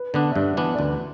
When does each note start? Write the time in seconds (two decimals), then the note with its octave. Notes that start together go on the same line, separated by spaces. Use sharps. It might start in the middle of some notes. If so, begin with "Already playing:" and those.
Already playing: B4
0.14 D3 B3 D4 D5
0.30 E5
0.35 G2 D5
0.57 E3 B3 D4 D5
0.73 D5
0.79 D2 B4